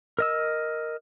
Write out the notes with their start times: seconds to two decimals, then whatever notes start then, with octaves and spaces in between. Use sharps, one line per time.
0.19 A#4 D#5 E6